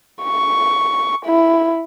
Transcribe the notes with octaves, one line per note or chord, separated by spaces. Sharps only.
C#6
E4